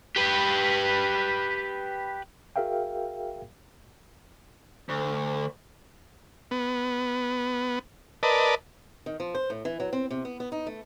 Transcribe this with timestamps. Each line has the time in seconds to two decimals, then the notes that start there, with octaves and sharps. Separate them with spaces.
0.16 G4 B4
2.56 F#4 G#4 A#4 E5 F5 G5
4.89 D2
6.51 B3
8.23 A#4 B4 D5 D#5 A5
9.06 D#3
9.20 F3
9.35 C5
9.50 A2
9.65 E3
9.80 F#3
9.93 C4
10.10 C3
10.25 B3
10.40 B3
10.52 D#4
10.67 A3